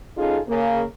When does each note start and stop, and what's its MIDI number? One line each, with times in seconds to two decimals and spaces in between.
0.16 0.38 61
0.16 0.38 63
0.16 0.38 65
0.16 0.38 68
0.16 0.38 69
0.47 0.82 49
0.47 0.82 58